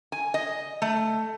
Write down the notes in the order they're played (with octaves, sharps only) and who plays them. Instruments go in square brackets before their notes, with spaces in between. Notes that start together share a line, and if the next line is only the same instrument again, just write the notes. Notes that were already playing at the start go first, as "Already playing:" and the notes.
[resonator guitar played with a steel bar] G#5
D#5
A3